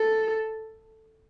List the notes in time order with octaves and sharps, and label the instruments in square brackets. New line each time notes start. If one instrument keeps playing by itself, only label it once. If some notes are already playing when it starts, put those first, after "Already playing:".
Already playing: [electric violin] A4